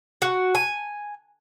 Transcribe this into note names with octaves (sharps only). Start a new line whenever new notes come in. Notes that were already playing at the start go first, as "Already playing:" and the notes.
F#4
G#5